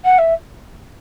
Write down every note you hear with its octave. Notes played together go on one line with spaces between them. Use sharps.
F#5
E5